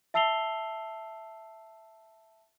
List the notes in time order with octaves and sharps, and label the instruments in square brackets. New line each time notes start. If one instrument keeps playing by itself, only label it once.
[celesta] E5 A5 E6 C7 F7 G7